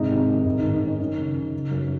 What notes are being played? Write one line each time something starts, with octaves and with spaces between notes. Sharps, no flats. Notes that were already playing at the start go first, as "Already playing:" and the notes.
Already playing: G#2 C3 D#4
D#3
D#3
G#2 D#4
D#4
D#3
D#4
D#3 C#4
F#2 D#4
C#3
C#3
C#3
F#2